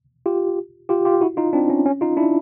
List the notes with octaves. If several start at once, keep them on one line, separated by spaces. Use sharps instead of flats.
F4 G4
F4 G4
F4 G4
E4 F#4
D#4 F4
C4 D4
C#4
C#4
D#4 F4
D4 E4